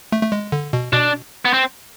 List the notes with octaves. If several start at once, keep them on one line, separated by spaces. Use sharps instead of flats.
A3
A3
G#3
D3
B2
B2 D4
B3
C4